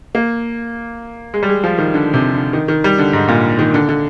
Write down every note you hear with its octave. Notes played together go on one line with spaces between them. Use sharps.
A#3
G#3
G3
G#3
F3
D#3
D3
C3
D3
D#3
D#3
G3
D3
G#2
A#2
D#3
D3
D3